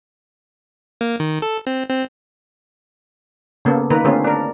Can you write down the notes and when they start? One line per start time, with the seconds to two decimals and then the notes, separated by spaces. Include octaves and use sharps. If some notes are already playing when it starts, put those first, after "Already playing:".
1.01 A#3
1.20 D#3
1.42 A4
1.67 C4
1.89 C4
3.65 C#3 A#3 B3 A4
3.90 D#3 A#3 A#4 B4
4.04 D3 A3 C4 C#4 F4 G#4
4.24 D4 A#4